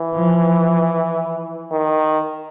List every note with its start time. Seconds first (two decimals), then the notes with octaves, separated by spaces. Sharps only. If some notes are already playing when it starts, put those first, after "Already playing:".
Already playing: E3
0.14 F3
1.71 D#3